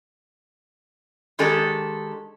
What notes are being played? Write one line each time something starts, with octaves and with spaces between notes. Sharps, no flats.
D#3 G#3 D4 G4 A4